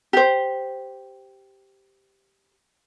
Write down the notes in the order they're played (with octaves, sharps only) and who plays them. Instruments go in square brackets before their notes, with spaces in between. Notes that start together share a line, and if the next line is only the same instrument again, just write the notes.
[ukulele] G4 C5